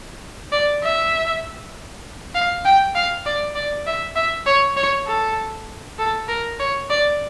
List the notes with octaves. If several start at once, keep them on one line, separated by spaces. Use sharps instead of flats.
D5
E5
F5
G5
F5
D5
D5
E5
E5
C#5
C#5
A4
A4
A#4
C#5
D5